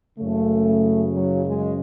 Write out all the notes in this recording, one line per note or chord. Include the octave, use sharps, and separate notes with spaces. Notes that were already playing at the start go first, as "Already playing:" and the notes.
F#1 F#2 C#3 A3
F#3
G#3